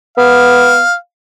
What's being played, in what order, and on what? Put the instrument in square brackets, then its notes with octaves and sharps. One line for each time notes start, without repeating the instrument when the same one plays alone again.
[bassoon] B3 [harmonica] F5